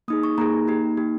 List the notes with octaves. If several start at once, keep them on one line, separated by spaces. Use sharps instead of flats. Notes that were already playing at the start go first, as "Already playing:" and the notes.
A#3 D#4 G#4 D#6
C#6
A#3 D#4 G#4 A#5
A#3 D#4 G4
A#3 D#4 G4